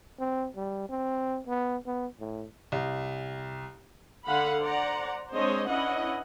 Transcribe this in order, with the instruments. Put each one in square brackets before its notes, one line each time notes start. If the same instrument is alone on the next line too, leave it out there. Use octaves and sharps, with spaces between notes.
[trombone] C4
G3
C4
B3
B3
A2
[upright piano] C2
[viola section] D3 F5 F#5 B5
C5 D5 F#5 A#5
G#3 C4 D4 C5 C#5 D#5
C#4 D4 E4 B4 D#5 F#5